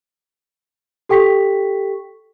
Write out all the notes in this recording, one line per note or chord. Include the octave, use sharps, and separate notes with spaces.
G4 A4 G5 C#6 B6